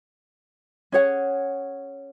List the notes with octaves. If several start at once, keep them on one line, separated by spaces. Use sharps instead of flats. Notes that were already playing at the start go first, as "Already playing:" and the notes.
C#4 G#4 C#5 F#5